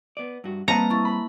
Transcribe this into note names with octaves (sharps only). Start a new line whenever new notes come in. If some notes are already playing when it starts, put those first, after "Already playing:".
B3 D5
G2 F#4
G3 A#3 C4 B4 D#5 F5 A5 A#5
E4 C#6 A6
B5